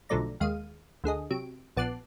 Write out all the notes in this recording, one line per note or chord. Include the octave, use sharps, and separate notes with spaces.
B1 D3 F3 A3 D5 A#5
D#2 G#3 F5 D#7
D2 D3 G#4 D#5
C3 F#3 D7
A#1 B3 A5 D6 F#6 C7